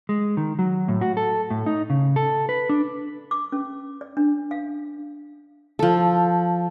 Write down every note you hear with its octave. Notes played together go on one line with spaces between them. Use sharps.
G#3
D#3
F#3
A2
F#4
A4
A2
D#4
C#3
A4
B4
D4
D6
C#4
D5
D4
F5
F3 A4